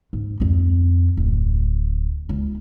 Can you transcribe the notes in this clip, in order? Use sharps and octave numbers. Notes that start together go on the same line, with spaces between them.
G#2
F2 C4
D1
C#2